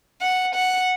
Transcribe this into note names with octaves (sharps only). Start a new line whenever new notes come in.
F#5
F#5